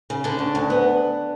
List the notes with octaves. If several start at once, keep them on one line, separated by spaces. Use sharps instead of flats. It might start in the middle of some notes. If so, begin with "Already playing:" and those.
C#3
D3 D4
D2
D2
B3